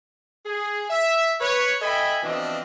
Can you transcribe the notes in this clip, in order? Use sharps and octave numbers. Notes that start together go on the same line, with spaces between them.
G#4
E5
B4 C#5
A4 D#5 E5 G5 G#5 B5
B2 E3 F3 C4 D4 D#5